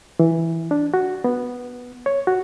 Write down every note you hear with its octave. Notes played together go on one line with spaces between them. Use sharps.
E3
D4
F#4
B3
C#5
F#4